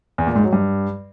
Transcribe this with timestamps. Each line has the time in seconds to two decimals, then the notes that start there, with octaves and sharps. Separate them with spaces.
0.18 E2
0.27 A#2
0.35 G#2
0.44 F#3
0.53 G2